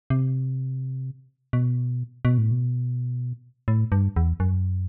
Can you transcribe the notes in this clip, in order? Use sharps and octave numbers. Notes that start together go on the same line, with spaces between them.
C3
B2
B2
A2
B2
A2
G2
E2
F#2